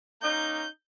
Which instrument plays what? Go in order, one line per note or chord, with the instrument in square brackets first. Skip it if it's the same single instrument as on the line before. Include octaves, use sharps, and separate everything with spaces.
[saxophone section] A#3 C#4 D#4 [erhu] G6